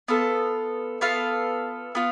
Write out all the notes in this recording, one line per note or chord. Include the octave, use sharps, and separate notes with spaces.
B3 F4 A4
B3 F4 A4 F5
B3 F4